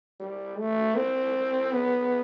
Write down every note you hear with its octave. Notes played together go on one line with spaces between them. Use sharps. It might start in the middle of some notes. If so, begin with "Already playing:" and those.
G3
A3
C4
B3